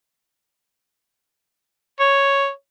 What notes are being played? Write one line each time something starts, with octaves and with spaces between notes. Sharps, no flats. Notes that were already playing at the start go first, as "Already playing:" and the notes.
C#5